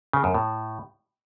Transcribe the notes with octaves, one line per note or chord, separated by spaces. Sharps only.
C#3
F#2
A2